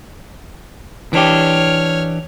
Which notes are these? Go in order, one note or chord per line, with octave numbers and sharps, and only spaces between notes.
E3 D4 G4 C#5 F6